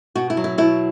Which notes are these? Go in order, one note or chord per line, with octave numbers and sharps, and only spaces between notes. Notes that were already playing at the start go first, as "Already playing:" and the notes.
B2 F#4
E4
F#3
E4
B2 E4